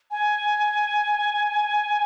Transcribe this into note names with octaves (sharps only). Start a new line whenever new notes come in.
G#5